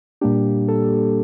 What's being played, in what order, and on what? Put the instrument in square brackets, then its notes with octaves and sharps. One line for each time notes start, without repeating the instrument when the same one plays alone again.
[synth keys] A#2 G3 A#3 D4 G4
A4